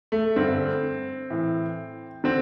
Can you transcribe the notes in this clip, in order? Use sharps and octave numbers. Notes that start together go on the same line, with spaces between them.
A3
G2 D3 C4
A2 E3
D3 C4